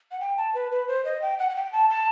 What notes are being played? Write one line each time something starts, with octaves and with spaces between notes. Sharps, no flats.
F#5
G5
A5
B4
B4
C5
D#5
G5
F#5
F#5
G5
A5
A5